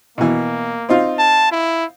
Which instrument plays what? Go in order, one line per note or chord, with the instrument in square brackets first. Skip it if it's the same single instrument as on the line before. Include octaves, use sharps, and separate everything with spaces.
[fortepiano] B2 E3 [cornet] A#3
[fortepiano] C4 D#4 F4
[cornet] A5
E4